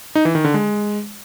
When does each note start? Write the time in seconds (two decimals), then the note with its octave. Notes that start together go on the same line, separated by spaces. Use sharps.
0.15 D#4
0.25 E3
0.35 D#3
0.44 D3
0.54 G#3